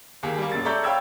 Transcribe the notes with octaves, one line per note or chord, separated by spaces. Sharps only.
D#2 A#3 G4 G#4
G3 A#3
E1 F#2 A6
A4 D5 E5 A#5 C#6 G6
C#5 F5 G5 B5 E6 G#6